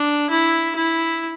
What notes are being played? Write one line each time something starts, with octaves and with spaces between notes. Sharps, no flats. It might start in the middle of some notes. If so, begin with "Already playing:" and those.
Already playing: D4
E4
E4